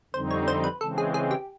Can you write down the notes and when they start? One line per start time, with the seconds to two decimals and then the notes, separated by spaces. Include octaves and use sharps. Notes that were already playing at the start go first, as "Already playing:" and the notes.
0.14 F2 D3 G3 C4 D#4 C5
0.31 C#5
0.48 C5
0.64 B4
0.81 C#3 E3 G#3 C4 A4
0.98 G#4
1.14 G#4
1.31 G4